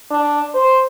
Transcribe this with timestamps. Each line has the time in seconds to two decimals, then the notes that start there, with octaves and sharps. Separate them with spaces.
0.11 D4
0.55 C5